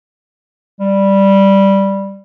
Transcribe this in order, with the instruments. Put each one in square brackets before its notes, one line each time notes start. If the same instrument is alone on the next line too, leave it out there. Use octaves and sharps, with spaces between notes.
[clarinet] G3